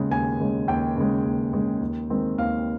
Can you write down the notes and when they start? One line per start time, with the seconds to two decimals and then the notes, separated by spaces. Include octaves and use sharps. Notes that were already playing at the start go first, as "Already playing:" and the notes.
Already playing: D#2 C#3 G#3
0.10 D#2 G#5
0.40 C#3 G#3
0.68 D#2 G5
0.97 C#3 G#3
1.25 D#2
1.53 C#3 G#3
1.81 D#2
2.10 D#3 G#3 C4
2.37 D#2 F5